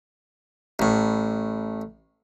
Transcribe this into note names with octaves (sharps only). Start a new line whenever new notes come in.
A1 A2